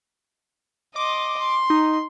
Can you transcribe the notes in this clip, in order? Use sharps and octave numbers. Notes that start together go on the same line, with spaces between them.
D#5 C6 D6
C6
D#4